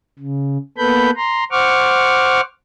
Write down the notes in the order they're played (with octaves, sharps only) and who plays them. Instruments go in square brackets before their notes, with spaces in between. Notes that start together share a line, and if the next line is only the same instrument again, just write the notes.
[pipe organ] C#3
A#3 B3 A4 B4 B5 G6
A#5 C6
C5 F#5 C#6 D6 F6